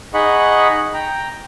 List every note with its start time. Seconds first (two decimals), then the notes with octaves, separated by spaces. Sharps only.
0.14 D#4 G#4 D#5 F#5 B5 C#6
0.94 G5 A#5